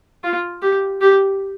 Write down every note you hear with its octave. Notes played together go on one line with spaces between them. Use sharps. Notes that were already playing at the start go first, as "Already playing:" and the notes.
F4
G4
G4